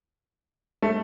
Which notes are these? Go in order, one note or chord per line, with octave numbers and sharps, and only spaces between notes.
A3